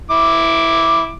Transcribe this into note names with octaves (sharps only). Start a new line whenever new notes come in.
E4 D6